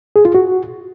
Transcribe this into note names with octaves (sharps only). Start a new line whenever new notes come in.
G#4
F4
F#4